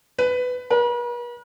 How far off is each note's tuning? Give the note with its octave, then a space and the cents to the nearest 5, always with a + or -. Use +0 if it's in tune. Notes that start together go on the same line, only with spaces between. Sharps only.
B4 +15
B4 -45